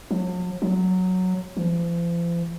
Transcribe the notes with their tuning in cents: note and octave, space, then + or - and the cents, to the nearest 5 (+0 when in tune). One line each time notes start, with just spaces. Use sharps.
F#3 -45
F#3 -5
F3 -40